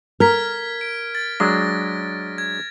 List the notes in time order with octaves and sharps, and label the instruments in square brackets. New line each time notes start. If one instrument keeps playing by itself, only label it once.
[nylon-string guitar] A#4 [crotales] F6 G#6 B6
[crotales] D7
A6
[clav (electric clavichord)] F#3 G#3 D4 [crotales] A#6
[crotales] G#6